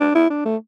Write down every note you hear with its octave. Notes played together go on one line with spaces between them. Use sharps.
D4
E4
D4
A3